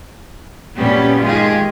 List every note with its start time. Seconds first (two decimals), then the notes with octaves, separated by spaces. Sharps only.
0.75 A#2 F#3 G3 B3 C#4 G4
1.22 D#3 G#3 F4 G4 G#4